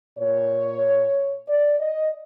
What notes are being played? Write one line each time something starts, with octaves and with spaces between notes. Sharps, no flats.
A#2 C#5
D5
D#5